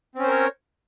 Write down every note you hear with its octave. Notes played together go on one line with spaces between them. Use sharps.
C4 C#4 A#4 C5 C#5